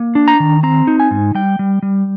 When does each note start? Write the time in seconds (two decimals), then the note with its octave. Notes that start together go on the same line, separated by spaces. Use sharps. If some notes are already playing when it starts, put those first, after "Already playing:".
Already playing: A#3
0.15 D4
0.28 A#5
0.40 D#3
0.63 C4 A#5
0.87 D#4
1.00 G#5
1.11 G#2
1.35 G3 G5
1.59 G3
1.83 G3